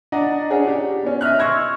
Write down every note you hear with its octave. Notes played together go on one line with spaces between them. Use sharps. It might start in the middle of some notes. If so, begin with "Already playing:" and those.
D4 D5 D#5 F#5 A#5
C#4 D4 G#4 C#5 F#5
D4 G4
B3 C#4
D#5 E5 F6 F#6
C6 C#6 E6 G#6 A#6